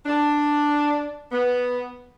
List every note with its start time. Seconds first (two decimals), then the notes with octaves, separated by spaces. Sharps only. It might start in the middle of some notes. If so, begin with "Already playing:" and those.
0.06 D4
1.32 B3